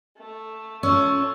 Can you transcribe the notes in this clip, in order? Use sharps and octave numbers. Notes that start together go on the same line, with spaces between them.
A3
A3 C#4 F4 C#6 E6